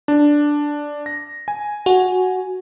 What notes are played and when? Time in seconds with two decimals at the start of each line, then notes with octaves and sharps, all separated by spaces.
0.08 D4
1.06 A#6
1.48 G#5
1.86 F#4